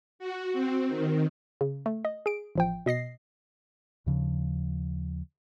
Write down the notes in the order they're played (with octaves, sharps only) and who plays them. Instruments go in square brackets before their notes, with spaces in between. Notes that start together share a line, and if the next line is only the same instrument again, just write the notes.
[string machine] F#4
C4
D#3
[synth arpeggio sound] C#3
A3
D#5
G#4 D7
A1 F3 G5
B2 D#5 A#6 C7
[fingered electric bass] D#2 C#3 F3